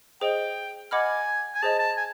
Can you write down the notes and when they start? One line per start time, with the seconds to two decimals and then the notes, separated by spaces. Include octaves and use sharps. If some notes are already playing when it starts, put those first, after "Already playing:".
0.21 G#4 C5 D#5 G5
0.91 D#5 F#5 G#5 B5 D6 F6
1.55 G#5
1.63 G#4 C5 D#5 A5
1.80 A5
1.97 G#5